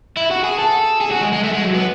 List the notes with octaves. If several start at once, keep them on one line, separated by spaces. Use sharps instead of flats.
E4
F#4
G#4
A4
G#4
F#4
G#3
G#3
A3
G#3
F#3
B3